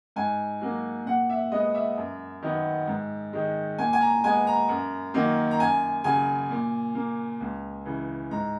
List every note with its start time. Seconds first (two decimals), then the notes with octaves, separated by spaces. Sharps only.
0.16 G#2 G#5
0.61 F#3 A#3
1.06 A#2 F#5
1.30 E5
1.52 G#3 B3 D#5
1.75 E5
1.97 F#2
2.42 D#3 F#3 B3
2.87 G#2
3.33 D#3 G#3
3.78 A#2 G#5
3.93 G#5
4.01 A#5
4.24 G#3 B3 G#5
4.47 A#5
4.69 F#2
5.14 D#3 F#3 A#3
5.51 A#5
5.59 F#2 G#5
6.04 C#3 F#3 G#5
6.51 A#2
6.95 A#3
7.41 C#2
7.85 C#3 E3
8.31 G#2 A#5